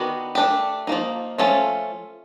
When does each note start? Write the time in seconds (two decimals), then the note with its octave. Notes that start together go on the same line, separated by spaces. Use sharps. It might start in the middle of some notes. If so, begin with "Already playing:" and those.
Already playing: D#3 B3 D4 F#4
0.35 A3 D4 G4
0.87 F3 A#3 D#4
1.38 F3 A3 C#4 F4 A4